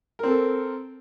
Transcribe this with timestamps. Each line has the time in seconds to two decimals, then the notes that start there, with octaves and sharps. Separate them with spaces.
0.19 A#4
0.23 C4
0.28 A4